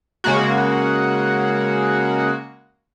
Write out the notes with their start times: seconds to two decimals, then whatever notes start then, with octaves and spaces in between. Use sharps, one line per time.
0.24 C#3 G#3 A#3 F#4